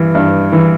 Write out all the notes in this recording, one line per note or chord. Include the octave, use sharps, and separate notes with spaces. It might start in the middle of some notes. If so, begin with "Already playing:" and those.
Already playing: G2 E3
G2
E3